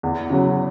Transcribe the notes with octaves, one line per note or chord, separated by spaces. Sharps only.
E2
C#3 F#3